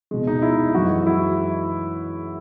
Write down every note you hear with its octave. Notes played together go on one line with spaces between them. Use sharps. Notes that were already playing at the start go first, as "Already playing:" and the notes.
B2 G#3
D#4
E4
F#2 E3 G#3 F#4
F#4
E4